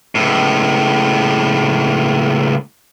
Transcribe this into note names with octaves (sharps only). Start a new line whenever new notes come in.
C#2 A2